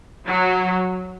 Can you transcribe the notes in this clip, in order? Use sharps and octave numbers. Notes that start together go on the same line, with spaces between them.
F#3